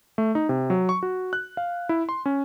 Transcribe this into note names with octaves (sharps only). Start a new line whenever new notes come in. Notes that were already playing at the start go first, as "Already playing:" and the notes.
A3
D#4
C3
F#3
C#6
F#4
F#6
F5
E4
C6
C#4